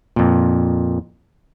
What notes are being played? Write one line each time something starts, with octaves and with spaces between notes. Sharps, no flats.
F2 A#2